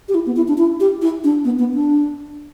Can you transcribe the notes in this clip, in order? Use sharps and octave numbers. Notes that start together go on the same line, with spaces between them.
G4
E4
B3
E4
D4
E4
G4
E4
D4
B3
B3
D4